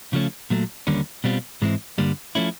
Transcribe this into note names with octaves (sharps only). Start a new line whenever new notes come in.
C#3 F3 A3 C#4
A#2 F#3 A3
D#2 D3 G3 A#3 C#4
B2 G3 C4 F4
G#2 E3 G#3 C4 E4
G2 D3 G3 A#3
F3 A3 C#4 E4